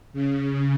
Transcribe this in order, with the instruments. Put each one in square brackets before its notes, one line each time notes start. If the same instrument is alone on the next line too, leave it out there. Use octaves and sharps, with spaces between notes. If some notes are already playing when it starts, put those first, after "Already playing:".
[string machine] C#3